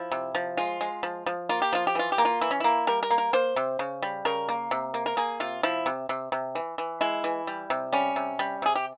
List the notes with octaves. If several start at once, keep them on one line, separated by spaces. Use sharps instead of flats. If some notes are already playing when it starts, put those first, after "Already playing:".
Already playing: F3 E4
C3
F3
G#3 F4
G#3
F3
F3
A#3 F4
G4
F3 F4
G4
E3 F4
G4
A#3
F4
E3 E4
C#4
A#3 E4
G3 A#4
A#4
A#3
A#4
A#3 C5
C3
C#3
G3
C#3 A#4
A#3
C3
A#3
A#4
A#3 G#4
C3 F4
F3 E4
C3
C3
C3
E3
E3
G#3 E4
E3
G3
C3
G3 C#4
C3
G3
C3 G#4
G4